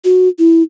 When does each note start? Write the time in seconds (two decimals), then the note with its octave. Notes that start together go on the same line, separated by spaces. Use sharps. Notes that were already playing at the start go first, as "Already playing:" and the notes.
0.05 F#4
0.39 E4